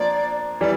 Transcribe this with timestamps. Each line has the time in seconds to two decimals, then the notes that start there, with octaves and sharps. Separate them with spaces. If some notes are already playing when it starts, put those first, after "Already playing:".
Already playing: F3 A#3 D4 D5
0.61 E3 G3 D5